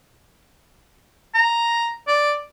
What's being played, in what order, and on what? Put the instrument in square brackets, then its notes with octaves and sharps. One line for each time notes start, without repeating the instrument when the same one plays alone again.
[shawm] A#5
D5